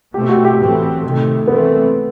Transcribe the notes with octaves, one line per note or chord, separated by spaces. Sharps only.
B2 A3 C4 G4
F#4
G4
A2 E3 A3 C4
C3 D#3 A3
E3 A3 B3 C4